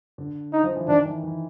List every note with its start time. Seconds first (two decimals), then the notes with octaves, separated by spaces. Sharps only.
0.18 D3
0.53 D#4
0.64 F3
0.76 E3
0.88 D#3 D4
1.05 E3
1.23 E3